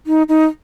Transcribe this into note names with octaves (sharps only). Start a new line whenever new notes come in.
D#4
D#4